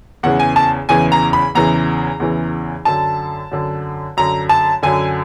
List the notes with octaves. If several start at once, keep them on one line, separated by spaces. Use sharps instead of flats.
E2 C#3 E3 F#5
G#5
A5
E2 C#3 E3 G#5
A#5
B5
E2 C#3 E3 A#5
E2 C#3 E3
F#2 D3 A5
F#2 D3
F#2 D3 A#5
A5
F#2 D3 G#5